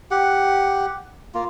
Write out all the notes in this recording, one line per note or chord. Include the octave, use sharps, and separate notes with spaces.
G4 F#5
A#3 F4